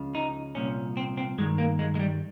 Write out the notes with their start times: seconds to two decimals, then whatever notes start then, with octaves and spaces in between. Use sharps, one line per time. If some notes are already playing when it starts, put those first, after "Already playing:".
Already playing: C#2 C#3 F3
0.15 D#4
0.55 C2 A#2 F3 C#4
0.97 C4
1.17 C4
1.38 G2 D#3 G#3
1.58 A#3
1.79 G#3
1.95 G#3
2.00 G3